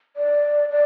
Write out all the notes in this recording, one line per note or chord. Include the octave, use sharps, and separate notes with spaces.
D5
D5